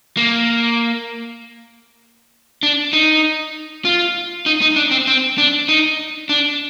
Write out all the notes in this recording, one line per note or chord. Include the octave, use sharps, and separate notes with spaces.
A#3
D4
D#4
F4
D#4
D#4
D4
C4
C4
D4
D#4
D4